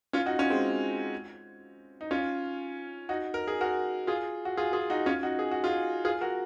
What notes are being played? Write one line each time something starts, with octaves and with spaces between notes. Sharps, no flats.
C#4 F4
D#4 F#4
C#4 F4
G#3 C4
D#4
C#4 F4
D#4 F#4
A#4
G#4
F#4 A#4
F4 G#4
F#4
F4 G#4
F4 G#4
D#4 F#4
C#4 F4
D#4 F#4
G#4
F#4
F4 G#4
F4 G#4
F#4 A#4